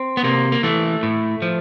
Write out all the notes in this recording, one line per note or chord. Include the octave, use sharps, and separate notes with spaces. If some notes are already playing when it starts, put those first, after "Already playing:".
Already playing: C4
B3
C3 A#3
A#3
E3 A3
A2
F3